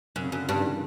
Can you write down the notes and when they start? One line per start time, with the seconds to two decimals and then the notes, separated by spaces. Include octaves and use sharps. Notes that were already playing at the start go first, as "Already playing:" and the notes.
0.16 F#2 C3
0.24 C#3
0.32 F#2 D3
0.40 C3
0.49 G2
0.56 D#3
0.65 E3